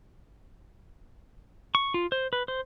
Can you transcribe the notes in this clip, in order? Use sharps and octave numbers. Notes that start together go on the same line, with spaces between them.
C#6
F4
C5
B4
C5